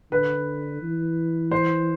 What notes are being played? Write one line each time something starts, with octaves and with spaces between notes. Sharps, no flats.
D3 B4
E3
C5